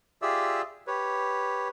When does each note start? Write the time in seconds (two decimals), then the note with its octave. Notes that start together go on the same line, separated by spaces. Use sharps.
0.22 F4 G4 G#4 D5 E5 E6
0.87 G4 B4 C#5